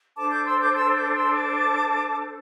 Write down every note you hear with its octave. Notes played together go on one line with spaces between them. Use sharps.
D4 A4 C5 A5 D6
D6 G6
C6 E6
D6 G6
C6 E6
D6 G6
C6 E6
A5 D6